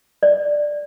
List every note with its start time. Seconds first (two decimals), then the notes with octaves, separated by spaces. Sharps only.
0.23 D5